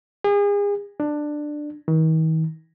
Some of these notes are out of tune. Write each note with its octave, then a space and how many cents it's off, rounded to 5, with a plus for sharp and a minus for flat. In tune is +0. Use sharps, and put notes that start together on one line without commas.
G#4 -35
D4 +15
D#3 +45